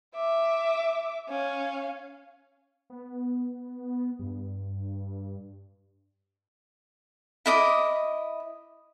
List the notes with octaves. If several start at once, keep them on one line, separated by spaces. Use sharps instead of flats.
E5 D6
C#4 F5
B3
G2
E4 D#5 D6